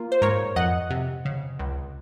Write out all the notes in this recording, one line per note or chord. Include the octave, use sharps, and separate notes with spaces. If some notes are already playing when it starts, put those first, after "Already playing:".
Already playing: A#3 F4
C5
G#2 A#4 C#5
F2 D#5 F#5
C3
C#3
C#2